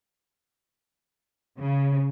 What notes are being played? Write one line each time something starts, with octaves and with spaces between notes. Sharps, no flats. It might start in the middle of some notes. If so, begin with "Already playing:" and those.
C#3